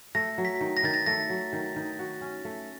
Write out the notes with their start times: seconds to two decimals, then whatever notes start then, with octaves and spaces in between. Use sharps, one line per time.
0.15 A3 A#6
0.38 F#3
0.45 B6
0.61 D#3
0.77 A#6
0.83 D#3 A6
0.94 A#6
1.06 A3 A#6
1.30 F#3
1.53 D#3
1.76 D#3
1.99 F#4
2.21 C#4
2.45 A3